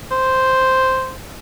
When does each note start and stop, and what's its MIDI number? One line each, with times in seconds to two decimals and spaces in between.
0.12 1.13 72